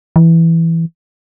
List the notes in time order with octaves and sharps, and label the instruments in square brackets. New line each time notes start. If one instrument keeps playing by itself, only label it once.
[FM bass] E3